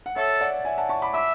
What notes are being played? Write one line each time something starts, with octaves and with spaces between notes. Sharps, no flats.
F#5
A4 C#5 E5
D5 F#5
E5 G#5
F#5 A5
A5 C#6
B5 D6
E5 B5 D6